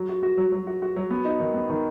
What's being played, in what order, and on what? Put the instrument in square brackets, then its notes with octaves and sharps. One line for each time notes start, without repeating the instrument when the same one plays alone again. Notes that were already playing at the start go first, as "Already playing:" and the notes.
Already playing: [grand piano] F#3
F#4
F#4
F#3
F#3
F#4
F#4
F#3
B3
D#4
D#3
B3
D#3